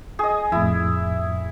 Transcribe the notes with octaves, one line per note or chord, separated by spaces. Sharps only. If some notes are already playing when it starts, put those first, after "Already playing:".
G#4 D#5
F2 A2 E4